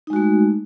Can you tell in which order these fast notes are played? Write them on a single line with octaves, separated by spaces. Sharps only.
D#4 G#3 F#4 A3